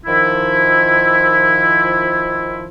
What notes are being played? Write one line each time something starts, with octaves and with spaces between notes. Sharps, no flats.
D#3 F3 E4